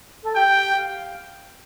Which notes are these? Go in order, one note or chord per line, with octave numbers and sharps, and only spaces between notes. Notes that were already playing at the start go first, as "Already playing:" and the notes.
A4
G4 G5
F5